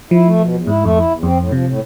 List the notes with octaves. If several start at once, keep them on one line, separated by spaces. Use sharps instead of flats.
F3 E4
A3
B2
E2
G#2 E4
F2 A3
E4
E2
F2 C4
A2
C3 F3
A2